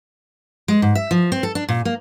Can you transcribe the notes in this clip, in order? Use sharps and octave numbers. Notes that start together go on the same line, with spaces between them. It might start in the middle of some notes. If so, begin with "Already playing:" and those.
G#3
G#2
E5
F3
C4
A4
D4
A#2
A#3